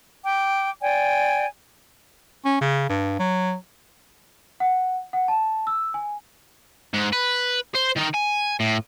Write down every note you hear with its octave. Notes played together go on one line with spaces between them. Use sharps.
G5 D6
D5 G5 G#5
C#4
C#3
G2
F#3
F#5
F#5
A5
E6
G#5
G#2
B4
C5
D#3 D#4
G#5
A2